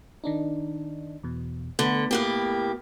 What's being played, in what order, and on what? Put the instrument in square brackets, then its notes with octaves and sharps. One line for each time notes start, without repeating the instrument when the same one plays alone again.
[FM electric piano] D#3 D4 D#4
E2 B2
[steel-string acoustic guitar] D3 [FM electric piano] A3 B3 B5
[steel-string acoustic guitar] A2 A#3 G4